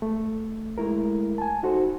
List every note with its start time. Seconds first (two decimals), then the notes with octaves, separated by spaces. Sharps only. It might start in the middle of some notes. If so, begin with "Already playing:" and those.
0.02 A3
0.78 G#3 A3 E4 A#4
1.38 G#5 A5
1.63 D#4 F#4 A4 C5